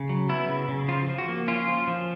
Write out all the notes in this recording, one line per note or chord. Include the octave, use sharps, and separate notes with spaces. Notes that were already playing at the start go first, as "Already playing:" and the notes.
Already playing: C#3
F#3
B3 E4
C#3
C#3
F3 F4
F3
F#4
A#3
C#4 F4
F3
F3